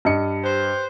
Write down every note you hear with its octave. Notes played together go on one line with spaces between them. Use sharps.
G2 D#5 C#7
G4 B4 C5